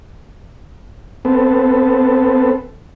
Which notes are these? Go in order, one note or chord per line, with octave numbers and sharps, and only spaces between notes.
B3 C4 A4